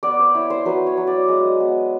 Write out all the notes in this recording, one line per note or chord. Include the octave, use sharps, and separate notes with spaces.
B3 D5
C5
E4 C#5
C5
F#3 B4
C#5
F#3
D5
G#3 D#5
B3